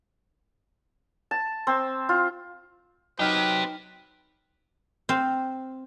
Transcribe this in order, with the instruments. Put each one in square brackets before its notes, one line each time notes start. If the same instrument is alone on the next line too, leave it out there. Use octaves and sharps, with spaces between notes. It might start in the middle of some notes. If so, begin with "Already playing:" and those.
[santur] A5
C4
F4
[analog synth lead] F#3 [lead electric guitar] C4 G4 [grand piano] D#4 G5 F6 [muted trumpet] B4
[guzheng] C4 F5